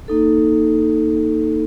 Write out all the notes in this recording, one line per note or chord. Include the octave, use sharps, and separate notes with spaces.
A#3 D#4 A4